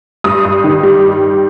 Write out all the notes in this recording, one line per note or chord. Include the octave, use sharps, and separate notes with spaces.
G2 D#6
G2
D#3
G3